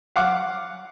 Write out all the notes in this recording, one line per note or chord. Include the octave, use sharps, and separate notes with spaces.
F5 F#5 D6